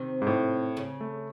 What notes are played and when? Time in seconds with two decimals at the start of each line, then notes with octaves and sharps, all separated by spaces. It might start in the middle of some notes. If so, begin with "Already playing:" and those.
Already playing: C3 D#3
0.22 G#2
0.27 A2
0.77 C#3
1.01 A3